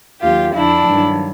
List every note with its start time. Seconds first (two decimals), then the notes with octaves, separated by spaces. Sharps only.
0.21 D#2 D#3 F#3 F4 G4
0.54 F2 D3 F3 D4 E4
0.88 G2 D#3 F#3